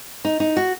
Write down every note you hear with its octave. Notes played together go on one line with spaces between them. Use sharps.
D#4
D#4
F#4